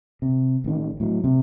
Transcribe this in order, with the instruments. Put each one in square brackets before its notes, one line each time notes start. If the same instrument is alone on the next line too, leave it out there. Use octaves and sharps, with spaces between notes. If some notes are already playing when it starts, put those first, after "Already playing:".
[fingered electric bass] C3
A1 D#3
A2 F#3
C3